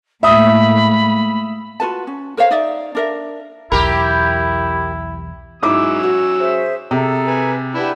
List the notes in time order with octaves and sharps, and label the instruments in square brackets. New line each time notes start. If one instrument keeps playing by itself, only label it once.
[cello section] A2 G#3 A#3 [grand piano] E5 D#6 [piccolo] B5
[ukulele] F4 F#4 B4 A5
C#4
A#4 C5 C#5 F5
D#4 D5 E5
D4 A#4 E5
[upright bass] B1 E2 [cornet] E4 [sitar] G4 A#4 [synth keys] B5
[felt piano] G#2 E4 D6 [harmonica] F#3 C#4 E6
[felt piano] F#4
[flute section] G#4 C5 E5
[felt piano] C3 [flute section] G#4 A4 A#5
[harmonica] B4 G#5
[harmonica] D4 E4 [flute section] G4 B4 F#5